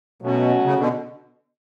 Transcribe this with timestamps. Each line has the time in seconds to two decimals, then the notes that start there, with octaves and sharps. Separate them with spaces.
0.22 B2 F#3 A3 C#4 F#4
0.64 C#3
0.78 B2 D3